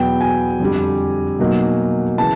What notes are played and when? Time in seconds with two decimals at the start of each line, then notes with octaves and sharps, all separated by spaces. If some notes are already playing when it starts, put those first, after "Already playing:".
Already playing: E2 B2 F#3 B3 G5
0.21 G#5
0.60 F2 D3 G3
1.39 B2 F#3 A#3 D#4
2.18 C#3 E3 A5